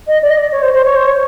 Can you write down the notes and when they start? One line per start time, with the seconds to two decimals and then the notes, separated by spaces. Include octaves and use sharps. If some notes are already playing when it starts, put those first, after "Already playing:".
0.07 D#5
0.22 D5
0.30 D#5
0.36 D5
0.51 C#5
0.62 C5
0.73 C5
0.84 C#5
0.95 C5
1.06 C#5